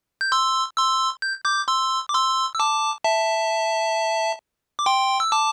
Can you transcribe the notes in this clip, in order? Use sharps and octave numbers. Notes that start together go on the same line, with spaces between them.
G6
C6 E6
C6 E6
G6
D6 G6
C6 E6
D6
C6 E6
E6
A5 D6
E5 A5
D6
G5 C6
E6
A5 D6